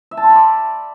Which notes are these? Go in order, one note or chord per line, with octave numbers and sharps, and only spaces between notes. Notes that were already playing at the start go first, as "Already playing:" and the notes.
E5
A5
C6
B5
D5